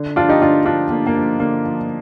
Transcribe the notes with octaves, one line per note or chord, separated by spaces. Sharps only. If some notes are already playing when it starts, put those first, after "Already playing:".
Already playing: D3
F3 D4 F4
D#4 G4
D3 D4 F4
F3 D4 F4
D3 A#3
A#3
F3
D3 A#3
F3